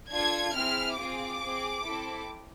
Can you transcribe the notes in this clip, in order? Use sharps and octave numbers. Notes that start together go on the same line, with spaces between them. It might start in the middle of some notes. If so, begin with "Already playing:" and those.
D4 F4 A4 G#6
C4 E4 G#4 F6
C4 F4 G#4 D6
C4 G#4
C4 E4 A4